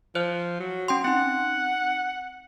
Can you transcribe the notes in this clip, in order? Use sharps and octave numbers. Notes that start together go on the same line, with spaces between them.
F3 C5 F#6
F#3
C#4 G5 C6
C4 D#4 F#5